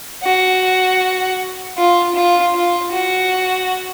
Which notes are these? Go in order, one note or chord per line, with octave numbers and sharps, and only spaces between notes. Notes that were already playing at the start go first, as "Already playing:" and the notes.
F#4
F4
F4
F4
F#4